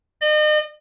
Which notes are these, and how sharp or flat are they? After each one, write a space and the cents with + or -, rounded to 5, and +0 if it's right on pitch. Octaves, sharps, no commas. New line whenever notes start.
D#5 -40